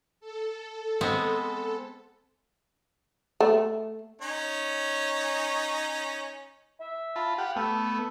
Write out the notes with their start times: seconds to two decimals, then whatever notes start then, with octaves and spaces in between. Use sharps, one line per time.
0.20 A4
1.01 G#3 B3 C4
3.40 A3
4.22 C#4 D#4 C#5
6.80 E5
7.16 F4 A5 B5
7.38 G4 F5 F#5
7.56 A3 B3 A4